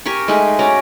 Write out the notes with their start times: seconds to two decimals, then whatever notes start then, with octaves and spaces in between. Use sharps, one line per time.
0.06 G4 A#4 G#5 C#6
0.28 G#3 A3 D#4 G#4
0.59 C#4 F#4 D5 A#5